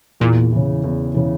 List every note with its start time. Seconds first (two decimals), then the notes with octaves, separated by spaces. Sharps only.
0.20 E2 A#2
0.53 C#3 E3
0.84 E2
1.14 C#3 E3